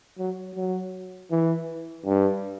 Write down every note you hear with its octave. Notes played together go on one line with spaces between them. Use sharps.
F#3
F#3
E3
G2